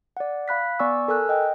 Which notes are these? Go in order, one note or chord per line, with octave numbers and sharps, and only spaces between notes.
D5 F#5
F5 B5 F#6 B6
B3 D5 G#5 C#6 E6
A4 A#4 G#5 E6 F#6
D#5 G5